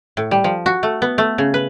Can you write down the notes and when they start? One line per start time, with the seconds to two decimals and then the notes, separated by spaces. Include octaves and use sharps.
0.17 A2
0.31 G3
0.44 F3
0.66 F#4
0.83 A3
1.02 B3
1.18 A3
1.38 C#3
1.54 B4